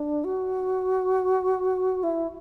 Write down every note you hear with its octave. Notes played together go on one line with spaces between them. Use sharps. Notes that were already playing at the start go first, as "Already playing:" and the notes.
Already playing: D4
F#4
E4